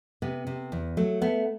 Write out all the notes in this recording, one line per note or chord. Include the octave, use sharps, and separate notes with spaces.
C3 B3
C3
E2
F#3 A3
A3 B3